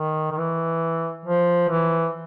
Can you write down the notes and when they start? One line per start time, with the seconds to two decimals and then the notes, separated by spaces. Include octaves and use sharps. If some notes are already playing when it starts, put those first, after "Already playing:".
Already playing: D#3
0.31 D#3
0.38 E3
1.25 F3
1.69 E3